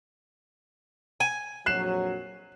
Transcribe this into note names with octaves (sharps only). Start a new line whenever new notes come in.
G#5
A#1 F2 F#3 F#6 C7 E7